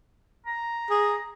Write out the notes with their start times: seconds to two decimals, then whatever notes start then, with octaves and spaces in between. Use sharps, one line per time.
0.46 A#5
0.90 G#4